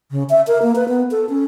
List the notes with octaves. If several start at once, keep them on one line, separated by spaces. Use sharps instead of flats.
C#3
E5
A#4
A#3
B4
B3
A4
C#4